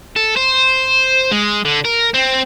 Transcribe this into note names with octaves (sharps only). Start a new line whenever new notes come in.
A4
C5
G#3
D3
A#4
C4